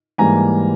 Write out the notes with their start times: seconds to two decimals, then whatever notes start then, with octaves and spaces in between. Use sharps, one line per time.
0.18 G#2 E3 G3 A#3 G#5 A#5